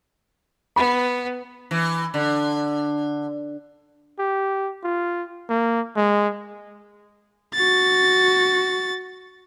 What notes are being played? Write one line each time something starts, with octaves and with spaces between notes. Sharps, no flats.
B3 B5
E3
D3
G4
F4
A#3
G#3
F#4 A6